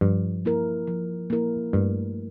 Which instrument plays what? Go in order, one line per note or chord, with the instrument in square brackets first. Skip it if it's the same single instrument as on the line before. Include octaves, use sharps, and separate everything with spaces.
[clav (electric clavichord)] G2 [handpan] F3
[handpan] A#3 E4 A#4
F3
A#3 E4 A#4
[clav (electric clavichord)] G2 [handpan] A3